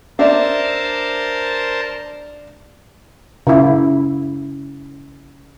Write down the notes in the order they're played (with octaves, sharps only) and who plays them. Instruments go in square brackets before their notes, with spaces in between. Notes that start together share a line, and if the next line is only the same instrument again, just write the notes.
[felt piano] D4 E5 [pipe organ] A#4 C5 A5
[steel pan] C#3 E4